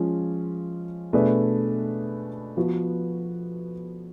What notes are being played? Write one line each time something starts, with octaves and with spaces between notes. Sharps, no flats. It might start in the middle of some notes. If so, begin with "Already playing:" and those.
Already playing: F3 G#3 C#4 F4
B2 A3 D4 G#4 B4
F3 B3 F#4 B4